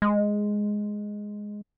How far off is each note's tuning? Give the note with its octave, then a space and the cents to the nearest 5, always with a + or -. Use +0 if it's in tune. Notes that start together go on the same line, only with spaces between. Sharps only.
G#3 +0